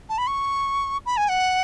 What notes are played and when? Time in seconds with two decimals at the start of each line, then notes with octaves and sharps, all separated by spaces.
0.09 A5
0.18 B5
0.27 C#6
1.06 B5
1.17 G#5
1.29 F#5